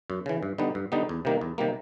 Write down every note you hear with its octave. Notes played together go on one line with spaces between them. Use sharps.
F#2
C#3 E3
G2
D3 G3 B3 D#4
G2
D3 G3 B3 D#4
E2
C3 D#3 G3 A#3
E2
C3 D#3 G3 A#3